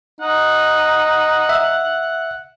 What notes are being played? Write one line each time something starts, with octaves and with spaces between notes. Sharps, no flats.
D#4 F#5
E5